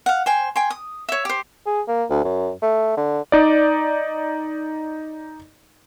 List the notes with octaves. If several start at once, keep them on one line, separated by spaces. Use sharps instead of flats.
F5 F#5
C5 G5 G#5
G5 G#5 C6
D#6
C#5 E5
G4 C5
G#4
A#3
D2
F#2
A3
D3
D#4 D5